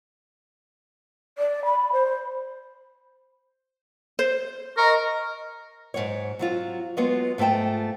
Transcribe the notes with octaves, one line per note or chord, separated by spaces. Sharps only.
D5
B5
C5
C5
A#4 D#5 A#5 C#6
G#2 F3 F#3 C#5
F#3 C4 F4
F#3 G#3 B3 F4 F#4
G#2 A3 F4 G5 A5